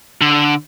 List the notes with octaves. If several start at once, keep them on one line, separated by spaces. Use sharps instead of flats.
D3